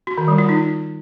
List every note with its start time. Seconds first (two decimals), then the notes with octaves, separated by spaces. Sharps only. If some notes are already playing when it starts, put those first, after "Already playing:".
0.07 F#4
0.18 D#3
0.28 G3
0.38 F4
0.49 D#4